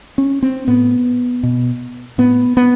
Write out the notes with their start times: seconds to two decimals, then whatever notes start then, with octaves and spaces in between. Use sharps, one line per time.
0.18 C#4
0.43 C4
0.68 A2 B3
1.43 B2
2.18 A2 B3
2.57 B3